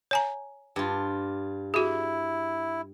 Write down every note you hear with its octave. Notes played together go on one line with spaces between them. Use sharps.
C#5 G#5 A#5
G2 F4
E4 F#4 G#4